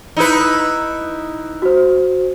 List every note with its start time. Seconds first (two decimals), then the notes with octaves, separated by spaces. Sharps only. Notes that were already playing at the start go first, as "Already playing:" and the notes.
0.17 D#4 E4 B4
1.62 F#4 C5